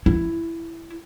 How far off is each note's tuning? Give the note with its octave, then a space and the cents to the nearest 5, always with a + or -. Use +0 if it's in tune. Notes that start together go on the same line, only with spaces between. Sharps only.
E4 +10